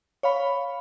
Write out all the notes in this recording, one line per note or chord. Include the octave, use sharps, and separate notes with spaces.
C#5 F5 B5